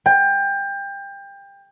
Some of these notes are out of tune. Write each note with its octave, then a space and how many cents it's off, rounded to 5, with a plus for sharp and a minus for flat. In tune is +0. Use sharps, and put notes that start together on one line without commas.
G5 +25